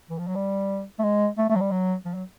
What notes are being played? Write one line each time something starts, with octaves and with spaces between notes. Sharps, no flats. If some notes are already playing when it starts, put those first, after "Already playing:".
E3
F3
F#3
G3
A3
G#3
A3
A3
F#3
G3
F#3
F3
F#3